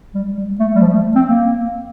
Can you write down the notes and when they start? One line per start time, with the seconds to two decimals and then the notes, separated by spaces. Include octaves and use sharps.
0.15 G3
0.37 G3
0.59 A3
0.75 G3
0.82 F3
0.93 A3
1.16 C4
1.26 A#3